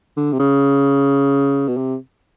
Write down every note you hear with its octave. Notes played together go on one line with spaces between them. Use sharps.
D3
C3
C#3
B2
C3